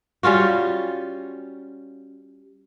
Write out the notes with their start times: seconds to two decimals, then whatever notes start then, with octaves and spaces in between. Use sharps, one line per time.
0.23 G3 C#4 F4 F#4